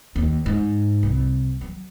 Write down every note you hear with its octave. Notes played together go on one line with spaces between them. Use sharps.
D#2
G#2
C2
F#3